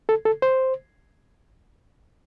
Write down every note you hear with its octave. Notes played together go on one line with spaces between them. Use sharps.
A4
A4
C5